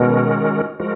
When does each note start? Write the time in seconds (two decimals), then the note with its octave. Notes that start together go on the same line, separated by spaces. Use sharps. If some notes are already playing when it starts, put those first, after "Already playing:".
Already playing: B2 D#3 G#3 C#4 F#4 A#4
0.80 F3 G#3 F#4 A#4